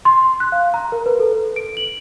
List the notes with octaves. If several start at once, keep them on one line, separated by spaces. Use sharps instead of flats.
C6
F#6
F5
A#5
A#4
B4
A4
D7
F#7